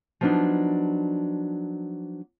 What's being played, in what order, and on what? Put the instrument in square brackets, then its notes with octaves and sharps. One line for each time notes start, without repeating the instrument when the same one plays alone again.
[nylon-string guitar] F3 F#3 B3 C4 D4 D#4